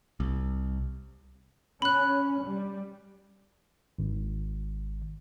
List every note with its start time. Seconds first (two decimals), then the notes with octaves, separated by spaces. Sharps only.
0.20 C2
1.82 C#4 B5 F#6
2.45 G3
3.99 G#1